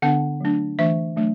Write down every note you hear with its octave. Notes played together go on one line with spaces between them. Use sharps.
D3 B3 D4 F#5
F#3 A3 D4
E3 A3 D4 E5
F#3 A3 D4